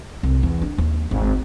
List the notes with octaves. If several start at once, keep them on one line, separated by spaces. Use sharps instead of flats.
C2
E2
D4
D#2
G#1